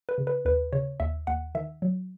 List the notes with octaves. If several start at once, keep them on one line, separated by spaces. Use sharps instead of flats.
B4
C#3
B4
D#2 B4
C#3 C#5
D#2 E5
D#2 F#5
D#3 E5
F#3